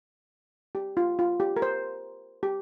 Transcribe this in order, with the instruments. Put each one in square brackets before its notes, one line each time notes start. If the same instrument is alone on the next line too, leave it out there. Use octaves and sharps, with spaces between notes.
[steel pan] G4
F4
F4
G4
A#4
C5
G4